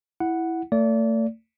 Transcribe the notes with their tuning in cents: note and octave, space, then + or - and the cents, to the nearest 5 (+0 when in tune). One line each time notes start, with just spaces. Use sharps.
E4 +0 F#5 +0
A3 +35 D5 -30